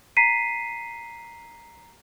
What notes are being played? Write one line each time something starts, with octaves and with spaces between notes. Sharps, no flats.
A#5 B6 C7 D#7